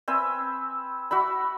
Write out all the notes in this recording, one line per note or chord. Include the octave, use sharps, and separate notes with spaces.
C4 B4 E5 G#5
F#4 E5 B5